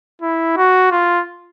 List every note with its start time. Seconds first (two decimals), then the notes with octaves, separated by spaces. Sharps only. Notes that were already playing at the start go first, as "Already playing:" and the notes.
0.22 E4
0.57 F#4
0.91 F4